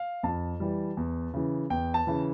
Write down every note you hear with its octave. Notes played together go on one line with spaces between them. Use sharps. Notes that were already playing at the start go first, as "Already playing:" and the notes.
Already playing: F5
F2 A5
E3 G3
E2
C#3 E3
E2 G5
A5
C#3 E3